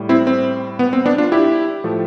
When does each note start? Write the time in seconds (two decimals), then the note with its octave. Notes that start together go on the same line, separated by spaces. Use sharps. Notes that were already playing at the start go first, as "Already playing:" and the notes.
Already playing: A2 G3
0.09 C4 E4
0.27 C4
0.79 B3
0.93 C4
1.06 B3 D4
1.18 D4 F4
1.32 E4 G4
1.84 A2 F3 A3